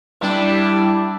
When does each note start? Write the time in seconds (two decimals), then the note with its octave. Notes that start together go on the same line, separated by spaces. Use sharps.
0.21 G3 D4 E4